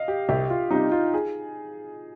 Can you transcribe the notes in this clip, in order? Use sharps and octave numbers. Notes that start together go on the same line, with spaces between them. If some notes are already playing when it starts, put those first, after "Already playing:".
Already playing: D#5 F5
G4
C2 G4
F4
C3 G3 D#4
F4
G#4